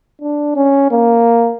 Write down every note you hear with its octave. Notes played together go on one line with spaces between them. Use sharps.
D4
C#4
A#3